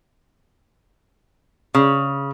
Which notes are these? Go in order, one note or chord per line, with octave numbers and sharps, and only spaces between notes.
C#3